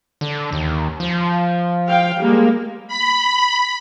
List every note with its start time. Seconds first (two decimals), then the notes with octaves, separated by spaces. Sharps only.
0.21 D3
0.52 D#2
1.00 F3
1.87 F5 G5
2.20 G3 G#3 A#3
2.88 B5